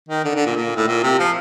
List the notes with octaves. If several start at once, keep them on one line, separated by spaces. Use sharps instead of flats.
D#3
D3
D3
A#2
A#2
A2
A#2
C3
F3